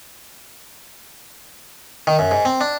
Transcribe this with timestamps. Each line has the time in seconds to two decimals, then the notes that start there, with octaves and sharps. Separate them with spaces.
2.07 D#3
2.19 F#2
2.31 G#2
2.45 C4
2.61 D4